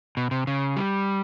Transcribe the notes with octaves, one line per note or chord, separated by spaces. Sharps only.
B2
C3
C#3
G3